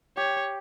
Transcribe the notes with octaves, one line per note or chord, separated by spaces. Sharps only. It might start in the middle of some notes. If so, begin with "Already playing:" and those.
G4 C#5